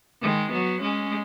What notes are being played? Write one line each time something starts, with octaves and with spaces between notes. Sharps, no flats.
D#3 G#3
F#3 B3
G#3 C#4